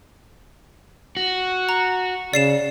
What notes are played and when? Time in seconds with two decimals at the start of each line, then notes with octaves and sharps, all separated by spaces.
1.17 F#4
1.69 A#5
2.33 C#3 D5 C7 E7